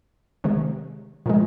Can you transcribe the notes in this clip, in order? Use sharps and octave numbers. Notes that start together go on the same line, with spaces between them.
C3 D#3 G#3
A#2 F3 G#3